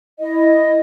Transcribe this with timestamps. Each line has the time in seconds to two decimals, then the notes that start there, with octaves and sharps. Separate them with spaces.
0.20 E4 D#5